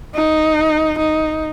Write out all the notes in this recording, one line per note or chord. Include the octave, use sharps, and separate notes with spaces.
D#4
D#4